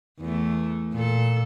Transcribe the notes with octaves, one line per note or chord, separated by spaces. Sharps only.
E2 A3
A#2 A4